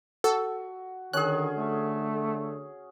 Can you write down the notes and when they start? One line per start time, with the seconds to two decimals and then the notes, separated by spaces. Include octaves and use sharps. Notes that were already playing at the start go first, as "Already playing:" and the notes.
0.24 F#4 A4
1.13 D3 D#3 C#4 G#4 F#6
1.56 A3